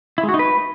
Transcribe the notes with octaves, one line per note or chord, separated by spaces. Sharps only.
E4
G#3
F#4
D#4
B4